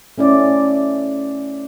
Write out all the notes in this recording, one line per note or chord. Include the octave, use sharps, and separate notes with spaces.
A3 C#4 E4 D5